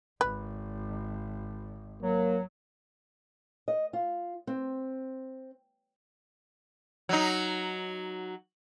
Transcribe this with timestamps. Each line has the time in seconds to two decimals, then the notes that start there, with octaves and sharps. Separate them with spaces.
0.21 G#1 B4
2.02 F#3 A#3
3.68 D#5
3.93 F4
4.47 C4
7.09 F#3 D#4